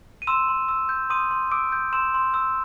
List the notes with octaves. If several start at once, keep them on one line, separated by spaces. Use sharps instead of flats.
D#7
C6 E6 E7
C6
E6
G6
C6 D#6 D#7
C6
D6 E6 D7
G6
C6 E6 E7
C6
E6